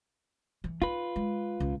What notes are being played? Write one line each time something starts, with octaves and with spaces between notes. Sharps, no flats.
E3
D#4 F4 B4
G#3
C#2